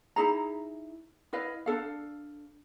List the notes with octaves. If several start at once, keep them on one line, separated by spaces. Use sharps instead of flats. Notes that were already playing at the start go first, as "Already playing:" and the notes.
D#4 E4 G#4 A#5
E4 B4 D#5 F5
D4 D#4 A4 F5